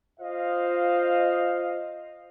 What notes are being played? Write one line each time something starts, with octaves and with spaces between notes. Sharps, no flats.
F4 C5 D#5 F5